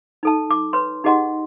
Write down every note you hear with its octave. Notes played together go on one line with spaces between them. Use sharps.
D#4 A4 A5
D6
B4 C#5 C6
D#4 G4 G#4 D#5 F#5 C6